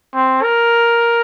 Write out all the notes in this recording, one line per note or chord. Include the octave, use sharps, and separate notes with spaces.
C4
A#4